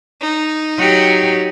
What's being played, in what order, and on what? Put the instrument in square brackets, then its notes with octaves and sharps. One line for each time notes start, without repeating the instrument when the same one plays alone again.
[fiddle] D#4
[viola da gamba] F#3 F#4 G4